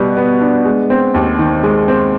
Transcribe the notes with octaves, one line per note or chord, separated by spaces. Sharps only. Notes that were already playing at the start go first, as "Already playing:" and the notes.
Already playing: B2 G3 B3
B3
D4
G#3
C4
D#2
D#3
G#3
C4